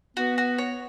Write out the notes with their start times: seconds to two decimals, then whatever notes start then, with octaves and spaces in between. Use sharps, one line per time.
0.17 B3 F#4
0.38 F#4
0.58 C#5